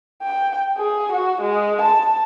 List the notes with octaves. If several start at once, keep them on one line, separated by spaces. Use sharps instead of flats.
G5
G#4
F#4
G#3
A5